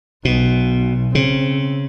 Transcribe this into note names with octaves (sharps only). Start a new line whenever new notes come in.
B1 B2
C#3 C4